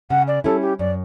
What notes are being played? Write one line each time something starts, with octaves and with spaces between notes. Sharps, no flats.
C#3 F#5
D5
G3 C#4 E4 A4
G4
F#2 D5